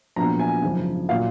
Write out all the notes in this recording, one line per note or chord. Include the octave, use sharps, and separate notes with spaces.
A#1 A#2 F#3 B3 A#5
G#5
G#1 F#2 C#3 F3
A#2 F#3 F5